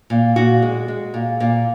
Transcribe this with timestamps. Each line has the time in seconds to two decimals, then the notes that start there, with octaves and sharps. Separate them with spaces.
0.10 A#2
0.36 A#2 F#4
0.62 G#3
0.88 G#3
1.14 A#2
1.40 A#2